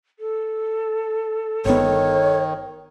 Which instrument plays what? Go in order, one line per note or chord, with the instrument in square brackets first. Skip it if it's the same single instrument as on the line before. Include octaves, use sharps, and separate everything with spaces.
[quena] A4
[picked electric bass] G1 B3 [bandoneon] D#3 [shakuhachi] C#5